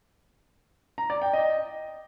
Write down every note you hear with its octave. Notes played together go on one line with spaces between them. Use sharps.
A#5
D5
G5
D#5